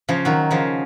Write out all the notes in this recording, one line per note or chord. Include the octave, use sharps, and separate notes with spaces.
C#3 F3
D#3 F#3
C#3 F3